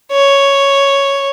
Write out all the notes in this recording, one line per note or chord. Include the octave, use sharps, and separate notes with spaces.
C#5